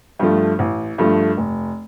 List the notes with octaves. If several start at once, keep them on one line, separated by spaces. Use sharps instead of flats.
G2 F3 A3
A1
G2 F3 A3
F1